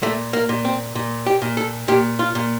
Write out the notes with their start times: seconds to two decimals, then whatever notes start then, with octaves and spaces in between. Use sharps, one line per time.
0.02 A#2 A3
0.33 A#3
0.49 A#2
0.65 C4
0.95 A#2
1.26 G4
1.42 A#2
1.57 A4
1.88 A#2 G4
2.19 F4
2.35 A#2